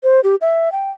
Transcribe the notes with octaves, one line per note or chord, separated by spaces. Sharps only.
C5
G4
E5
G5